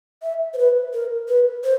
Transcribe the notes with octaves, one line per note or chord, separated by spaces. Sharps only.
E5
C5
B4
A#4
B4
C5